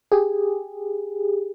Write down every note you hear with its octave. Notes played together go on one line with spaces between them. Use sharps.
G4 G#4